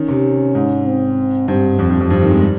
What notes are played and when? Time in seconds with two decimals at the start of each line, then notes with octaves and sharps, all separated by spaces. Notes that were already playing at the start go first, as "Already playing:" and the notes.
Already playing: D#3 C#4
0.08 C3
0.55 G#2
0.86 C4
1.48 G2 C4
1.79 F2 C4
1.90 G2
2.01 F2
2.10 G2 C4
2.21 D#3
2.31 G#3
2.42 G3